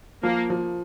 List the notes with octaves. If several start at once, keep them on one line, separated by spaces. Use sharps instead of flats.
F3 A#3
F3